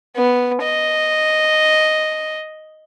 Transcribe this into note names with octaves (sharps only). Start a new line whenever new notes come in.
B3
D#5